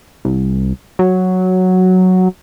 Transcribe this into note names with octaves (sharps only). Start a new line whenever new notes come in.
C2
F#3